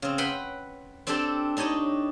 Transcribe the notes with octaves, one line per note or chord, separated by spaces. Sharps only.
C#3 C4
B4 F#5 G5 B5 C6
C4 D4 G4 A4 G5 A5
D4 D#4 G4 C#5 D#5